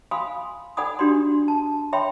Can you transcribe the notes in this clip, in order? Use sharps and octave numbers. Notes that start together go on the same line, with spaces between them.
F5 G#5 B5 C6 D#6
A4 D5 F#5 G#5 B5 D#6
D4 F#4 G4 D5 C6
A5
C#5 E5 G5 B5 C6